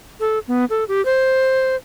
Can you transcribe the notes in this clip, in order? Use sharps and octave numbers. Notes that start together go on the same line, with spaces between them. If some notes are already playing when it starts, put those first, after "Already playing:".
A4
B3
A4
G4
C5